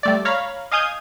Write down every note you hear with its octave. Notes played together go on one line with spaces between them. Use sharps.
G3 A3 D5
C#5 F5 A#5 B5
D#5 F5 G#5 D#6 G6 G#6